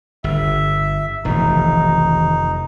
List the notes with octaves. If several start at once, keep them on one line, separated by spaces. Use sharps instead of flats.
G1 E5
F1 B1 D#3 E3 D#4